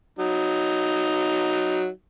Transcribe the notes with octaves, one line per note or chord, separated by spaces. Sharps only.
F#3 D#4